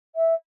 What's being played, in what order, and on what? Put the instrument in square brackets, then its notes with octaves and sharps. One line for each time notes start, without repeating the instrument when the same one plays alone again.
[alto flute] E5